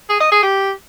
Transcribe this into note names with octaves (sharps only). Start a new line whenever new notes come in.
G#4
D#5
G#4
G4